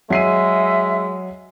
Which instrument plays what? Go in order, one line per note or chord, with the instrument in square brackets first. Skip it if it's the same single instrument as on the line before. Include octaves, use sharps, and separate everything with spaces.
[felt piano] F#3 C7 D#7 [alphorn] G#3 [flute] E5